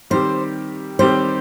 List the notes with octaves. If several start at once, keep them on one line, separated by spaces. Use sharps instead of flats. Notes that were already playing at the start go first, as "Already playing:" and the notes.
D#3 G3 C4 G4 C5
D#3 G3 C4 G4 C5